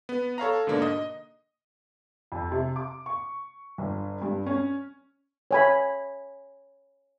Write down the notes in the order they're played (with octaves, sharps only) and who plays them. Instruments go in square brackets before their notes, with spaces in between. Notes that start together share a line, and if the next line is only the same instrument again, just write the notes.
[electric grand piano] B3
A4 C#5 F5 A#5
G#2 B2 D3 A#3 D4
D#5
[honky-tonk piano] F2
C3
D6
C#6
G1
G2
C#4
[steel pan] C#5 G#5 B5